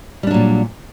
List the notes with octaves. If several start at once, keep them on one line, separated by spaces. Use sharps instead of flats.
A#2 F#3 G3 D4